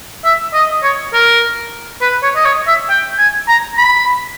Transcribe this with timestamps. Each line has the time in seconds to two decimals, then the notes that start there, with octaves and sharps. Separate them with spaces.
0.25 E5
0.54 D#5
0.83 C#5
1.13 A#4
2.01 B4
2.23 C#5
2.36 D#5
2.45 C#5
2.67 E5
2.90 G5
3.18 G#5
3.48 A#5
3.78 B5